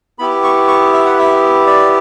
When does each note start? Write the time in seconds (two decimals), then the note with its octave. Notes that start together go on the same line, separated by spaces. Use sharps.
0.19 B3 E4 G4 B5
0.44 C#6
0.68 C#6
0.93 E5
1.05 F#5
1.19 E5
1.66 D5